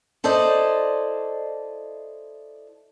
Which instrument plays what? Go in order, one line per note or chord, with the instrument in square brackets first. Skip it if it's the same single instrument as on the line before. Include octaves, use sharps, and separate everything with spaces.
[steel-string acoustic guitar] E4 A4 C5 D5 D#5